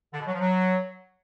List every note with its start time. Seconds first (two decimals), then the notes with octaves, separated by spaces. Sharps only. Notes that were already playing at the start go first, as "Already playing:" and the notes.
0.14 D3
0.20 B2
0.27 F#3
0.33 F3
0.40 F#3